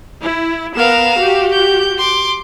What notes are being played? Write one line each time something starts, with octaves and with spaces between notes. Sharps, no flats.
E4
B3 A#4 F5 A#5 E7
F#4 G4
G6
C6 D6